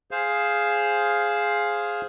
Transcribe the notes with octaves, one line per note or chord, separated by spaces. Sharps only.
G#4 C5 F5